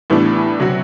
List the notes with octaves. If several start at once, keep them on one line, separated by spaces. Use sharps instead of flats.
A2 E3 G3 B3 D4
C3 F#3 C4 F#4